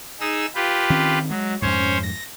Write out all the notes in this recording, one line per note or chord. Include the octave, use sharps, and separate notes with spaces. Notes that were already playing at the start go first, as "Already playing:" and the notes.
D#4 G#4 E6
F4 G4 B4
D#3 C4 C#4
F#3 G#3
F2 G#2 C#4 C5 C#5
A#6